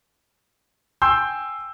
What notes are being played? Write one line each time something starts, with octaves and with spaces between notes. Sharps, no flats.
G5 G#5 C6 E6 G6